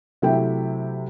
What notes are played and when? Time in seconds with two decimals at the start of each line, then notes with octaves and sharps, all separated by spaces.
0.22 C3 F#3 A3 E4 G4 G5